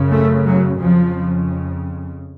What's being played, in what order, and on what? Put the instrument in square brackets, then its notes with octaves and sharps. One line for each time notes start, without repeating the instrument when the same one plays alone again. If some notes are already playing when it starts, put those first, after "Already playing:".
Already playing: [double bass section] F#2 C#3
A3
F#3
F2 C#3 F3